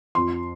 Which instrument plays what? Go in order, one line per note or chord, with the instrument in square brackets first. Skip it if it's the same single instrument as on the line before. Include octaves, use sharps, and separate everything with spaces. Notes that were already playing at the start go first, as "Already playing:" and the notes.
[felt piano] F2 C6